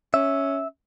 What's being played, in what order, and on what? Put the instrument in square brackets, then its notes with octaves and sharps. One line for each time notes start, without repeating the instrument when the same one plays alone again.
[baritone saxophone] C#4 [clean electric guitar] E5